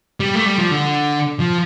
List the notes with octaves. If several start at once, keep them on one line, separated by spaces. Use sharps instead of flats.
G3
A3
G3
F3
D3
F3